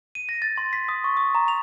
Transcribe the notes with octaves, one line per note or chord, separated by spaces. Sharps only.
D#7
A#6
A6
C6
B6
D#6
C#6
D#6
A#5
F7